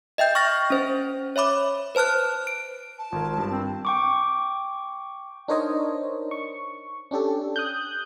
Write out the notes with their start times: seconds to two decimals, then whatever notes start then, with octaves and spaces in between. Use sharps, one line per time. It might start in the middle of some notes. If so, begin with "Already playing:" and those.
0.18 D#5 E5 G5 G6
0.35 C#6 F6 A6 A#6
0.70 C#4 C5
1.36 C#5 E5 B5 D6
1.95 B4 C5 A5 F6 F#6
2.47 D7
2.98 A5
3.12 G#1 F4 A#4
3.38 G2
3.52 C4
3.85 G5 C#6 D6
5.48 D4 D#4 A#4 C5 C#5 D#5
6.31 C#6
7.11 C#4 D4 G4 A4
7.56 D#6 F#6 G6